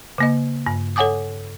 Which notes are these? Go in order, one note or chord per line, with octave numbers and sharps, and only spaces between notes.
C#3 A#3 D#5
G2
A4 C#5 F#5 G#5 D6 D#6